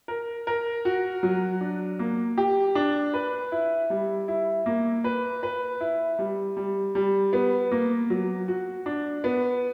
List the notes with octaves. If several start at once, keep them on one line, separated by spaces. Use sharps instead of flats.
A#4
A#4
F#4
F#3
D4
A#3
G4
D4
B4
E4
G3
E4
A#3
B4
B4
E4
G3
G3
G3
B3
A#3
F#3
F#4
D4
B3